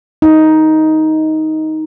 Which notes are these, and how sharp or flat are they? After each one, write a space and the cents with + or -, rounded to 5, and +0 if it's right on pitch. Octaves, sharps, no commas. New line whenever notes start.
D#4 +10